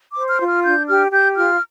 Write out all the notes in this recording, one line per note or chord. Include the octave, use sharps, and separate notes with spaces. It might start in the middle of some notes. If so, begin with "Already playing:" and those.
D6
C5
F6
F4
F6
D4 G6
G4 F6
G4 G6
F4 F6